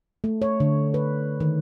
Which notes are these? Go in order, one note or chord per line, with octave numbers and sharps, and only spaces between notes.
A3
C#5
D3
B4
D#3